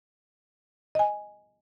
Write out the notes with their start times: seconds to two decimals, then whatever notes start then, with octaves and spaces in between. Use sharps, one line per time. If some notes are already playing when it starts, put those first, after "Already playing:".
0.95 D#5 G#5